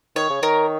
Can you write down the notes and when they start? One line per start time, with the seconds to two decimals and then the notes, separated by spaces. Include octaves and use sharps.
0.16 D#3 C#5
0.30 C#3
0.42 D#3 A#4